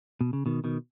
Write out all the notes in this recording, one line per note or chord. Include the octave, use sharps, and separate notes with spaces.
B2
C#3
B2 D#3
B2 D#3